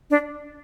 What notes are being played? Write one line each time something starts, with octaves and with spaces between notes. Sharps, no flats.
D4